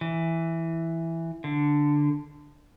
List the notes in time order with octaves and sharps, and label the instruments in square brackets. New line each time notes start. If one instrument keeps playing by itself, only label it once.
[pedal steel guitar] E3
D3